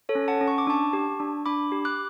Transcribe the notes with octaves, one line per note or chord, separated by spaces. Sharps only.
A4 C#5
C#4
F#5 A5
C#4
C#6
D6
D4 A5 C#6
G4
D4
D4 B5 D6
G4
D6 F#6